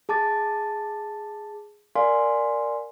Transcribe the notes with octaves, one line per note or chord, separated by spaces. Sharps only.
G#4 A5 D6 A6
A#4 D5 F5 G#5 C6